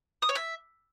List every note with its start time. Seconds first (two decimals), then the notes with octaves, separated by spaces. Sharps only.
0.22 D#6
0.29 C#5
0.35 E5